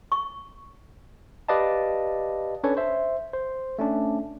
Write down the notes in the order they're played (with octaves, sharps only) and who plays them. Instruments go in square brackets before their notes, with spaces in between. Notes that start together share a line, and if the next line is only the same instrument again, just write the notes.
[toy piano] C#6
[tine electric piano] G4 B4 D5 D#5 F5 A5
C#4 D4 A4 B4 C#5
C5 E5
C5
A3 C#4 D4